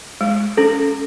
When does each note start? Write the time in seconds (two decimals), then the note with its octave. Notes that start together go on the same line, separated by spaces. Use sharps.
0.21 G#3
0.57 C#4 A4